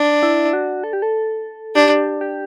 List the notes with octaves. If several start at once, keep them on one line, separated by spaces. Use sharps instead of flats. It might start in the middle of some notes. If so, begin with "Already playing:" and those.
Already playing: D4
E4
F#4
A4
G4
A4
D4 G4
G4